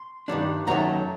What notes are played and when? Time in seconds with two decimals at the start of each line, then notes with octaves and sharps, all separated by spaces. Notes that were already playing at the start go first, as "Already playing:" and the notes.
Already playing: C6
0.28 G2 D#3 G3 D4
0.67 F#2 D#3 F#3 A3 A#5